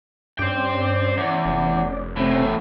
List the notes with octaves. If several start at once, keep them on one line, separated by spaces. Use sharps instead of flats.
G2 C#4 C5 D5 G5
E2
F1
E2 A2 C3 C4 C#4